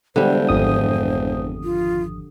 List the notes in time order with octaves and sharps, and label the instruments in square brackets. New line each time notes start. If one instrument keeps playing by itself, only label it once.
[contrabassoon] E1 [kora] D3 G3 [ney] C5
[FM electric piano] G#1 F2 D#6
[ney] F4